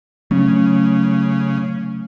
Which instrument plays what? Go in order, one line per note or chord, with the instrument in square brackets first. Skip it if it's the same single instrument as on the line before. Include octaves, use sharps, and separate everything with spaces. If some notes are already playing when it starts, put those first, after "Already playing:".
[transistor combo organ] C#3 [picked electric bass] F#3 A3 C#4